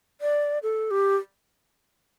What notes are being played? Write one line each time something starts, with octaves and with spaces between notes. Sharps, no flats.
D5
A4
G4